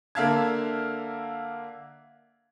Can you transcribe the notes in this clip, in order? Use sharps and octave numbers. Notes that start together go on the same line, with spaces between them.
D3 A#3 E5 F5 A5 G#6